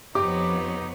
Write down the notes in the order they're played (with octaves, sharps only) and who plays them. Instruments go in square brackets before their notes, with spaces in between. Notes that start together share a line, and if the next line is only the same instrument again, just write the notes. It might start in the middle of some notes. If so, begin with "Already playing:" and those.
[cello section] F2 B3 C#5 [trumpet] D#4 [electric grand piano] G4 [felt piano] D6